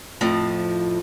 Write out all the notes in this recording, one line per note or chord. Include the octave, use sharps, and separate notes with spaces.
F2 A2 F3